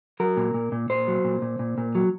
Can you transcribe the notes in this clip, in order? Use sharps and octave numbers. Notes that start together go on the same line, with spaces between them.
F#3 A#4
A#2
A#2
A#2
A#2 C5
F#3
A#2
A#2
A#2
A#2
F#3